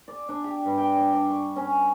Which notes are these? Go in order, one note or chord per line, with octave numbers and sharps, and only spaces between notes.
D5
D4
G4
G2
G5
D4
D4
C#6
C#4